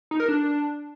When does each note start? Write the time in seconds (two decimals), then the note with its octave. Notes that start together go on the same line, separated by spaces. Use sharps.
0.11 D#4
0.20 A#4
0.28 D4